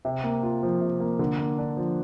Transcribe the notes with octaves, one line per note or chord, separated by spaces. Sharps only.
C3
A#3
F4
F3
C3
A#3
D3
A#3
D4
F3